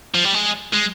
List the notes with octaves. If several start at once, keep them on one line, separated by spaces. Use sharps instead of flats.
F3
G3
G#3
G#3